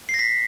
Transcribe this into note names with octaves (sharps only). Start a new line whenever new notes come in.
C7
A#6
B6